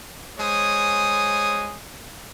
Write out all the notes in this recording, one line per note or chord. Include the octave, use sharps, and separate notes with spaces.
G#3 C5 C#5 G#5 D#6